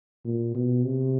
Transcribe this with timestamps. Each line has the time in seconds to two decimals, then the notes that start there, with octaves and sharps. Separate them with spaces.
0.25 A#2
0.55 B2
0.85 C3